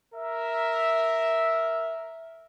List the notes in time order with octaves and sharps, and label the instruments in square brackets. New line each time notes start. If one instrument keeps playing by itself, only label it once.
[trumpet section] A#4 E5